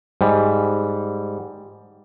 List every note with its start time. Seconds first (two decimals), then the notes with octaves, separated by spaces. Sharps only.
0.21 G#2 G3